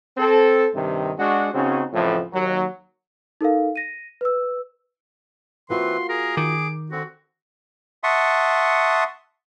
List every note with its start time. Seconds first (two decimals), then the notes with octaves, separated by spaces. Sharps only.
0.18 C4 A4
0.75 G2 C3 D#3
1.19 G#3 D4 F#4
1.54 C#3 C4 C#4 D#4 F#4
1.93 F2 A2 C#3 E3 F3
2.33 D#2 F#3
3.41 D#4 A4 A#4 F5
3.76 A#6 D#7
4.21 B4 E6
5.70 E3 A#3 C4 F4 F#4 B4 C6
6.09 G#4 A#4
6.37 D#3 D6
6.92 D3 C4 F#4
8.04 E5 F#5 A5 C6 C#6 D#6